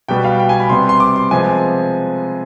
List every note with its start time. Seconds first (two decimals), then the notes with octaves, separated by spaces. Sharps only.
0.08 B2 G3 B3 G5
0.24 F5
0.39 G5
0.49 G#5
0.60 B5
0.70 C3 G3 B3 C6
0.89 C6
1.00 D6
1.16 C6
1.31 C3 F3 G#3 B3 G#5